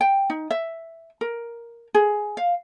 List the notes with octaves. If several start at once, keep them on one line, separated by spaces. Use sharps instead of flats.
G5
D#4
E5
A#4
G#4
F5